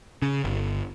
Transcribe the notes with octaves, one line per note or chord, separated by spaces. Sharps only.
C#3
G1